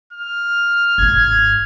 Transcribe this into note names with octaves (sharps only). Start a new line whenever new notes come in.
F6
G#1 G#2 G#6